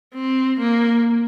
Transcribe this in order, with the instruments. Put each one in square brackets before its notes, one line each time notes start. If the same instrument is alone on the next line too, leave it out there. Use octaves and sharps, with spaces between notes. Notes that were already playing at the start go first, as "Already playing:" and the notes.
[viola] C4
A#3